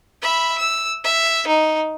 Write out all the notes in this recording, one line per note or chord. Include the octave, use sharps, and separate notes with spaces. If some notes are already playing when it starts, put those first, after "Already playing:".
E5 B5
E6
E5
D#4